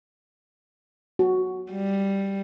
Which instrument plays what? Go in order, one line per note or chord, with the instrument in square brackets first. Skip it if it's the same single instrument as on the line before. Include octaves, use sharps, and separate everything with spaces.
[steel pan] F#4
[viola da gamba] G3